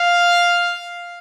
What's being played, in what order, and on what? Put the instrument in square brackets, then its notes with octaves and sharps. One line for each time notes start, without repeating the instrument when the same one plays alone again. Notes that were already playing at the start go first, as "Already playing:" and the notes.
Already playing: [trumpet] F5